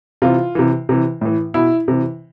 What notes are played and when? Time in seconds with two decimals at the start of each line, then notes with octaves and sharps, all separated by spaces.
0.22 C3 E3 F4
0.55 C3 E3
0.89 C3 E3
1.21 A2 E3
1.54 B2 E4
1.88 C3 E3